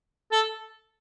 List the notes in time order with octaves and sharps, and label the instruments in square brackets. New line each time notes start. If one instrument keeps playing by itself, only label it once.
[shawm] A4